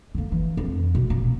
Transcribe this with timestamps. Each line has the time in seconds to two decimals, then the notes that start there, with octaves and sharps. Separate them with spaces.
0.15 D3 A#3
0.32 E3
0.57 F2
0.95 B2
1.10 D#1